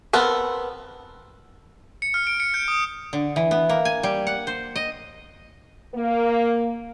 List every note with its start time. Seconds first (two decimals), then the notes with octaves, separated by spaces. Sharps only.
0.13 B3 C4 A4 A#4
2.02 C#7
2.14 F6
2.27 D7
2.40 C#7
2.54 G6
2.68 D#6
3.13 D3
3.36 E3
3.51 B3
3.69 A#3
3.85 G#5
4.03 G3
4.27 F#5
4.47 C5
4.76 D#5
5.95 A#3